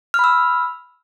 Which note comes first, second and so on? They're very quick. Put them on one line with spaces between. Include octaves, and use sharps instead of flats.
F6 B5 E6